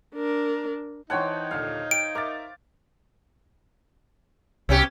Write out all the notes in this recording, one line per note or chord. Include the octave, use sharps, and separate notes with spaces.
D4 A#4
E3 D#4 C5 C#5 F#5 G5 A5
D#1 A#2 D3 F5
G5 D7
A#4 E5 D6 A6
C2 B2 C#4 G4